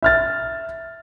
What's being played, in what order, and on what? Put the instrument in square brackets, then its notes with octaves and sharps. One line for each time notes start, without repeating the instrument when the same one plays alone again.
[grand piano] E5 F6 A6